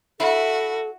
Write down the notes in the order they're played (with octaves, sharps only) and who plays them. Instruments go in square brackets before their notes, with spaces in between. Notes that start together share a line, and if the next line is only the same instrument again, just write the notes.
[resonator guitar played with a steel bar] E4 [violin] F#4 [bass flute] A4